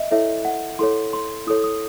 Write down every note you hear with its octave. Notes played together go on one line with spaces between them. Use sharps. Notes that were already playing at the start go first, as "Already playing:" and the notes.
Already playing: D#5 E5
E4 A4 C#5 E5
F#5
E4 A4 C#5 C6
C6
E4 A4 C#5 D#6
D#6